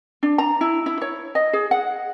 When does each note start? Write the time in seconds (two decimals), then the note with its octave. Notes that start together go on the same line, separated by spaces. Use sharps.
0.23 D4
0.38 A#5
0.61 E4
0.86 E4
1.01 C#5
1.35 D#5
1.53 G#4
1.71 F#5